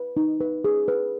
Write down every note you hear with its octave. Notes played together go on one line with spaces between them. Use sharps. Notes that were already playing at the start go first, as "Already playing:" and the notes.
Already playing: B4
D#4
B4
G#4
B4